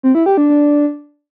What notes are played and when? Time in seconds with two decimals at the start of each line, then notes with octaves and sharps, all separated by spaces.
0.03 C4
0.15 E4
0.26 G4
0.37 D4
0.49 D4